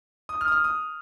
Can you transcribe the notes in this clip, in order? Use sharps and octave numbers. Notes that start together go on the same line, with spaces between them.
D#6
F6
D#6
F6
D#6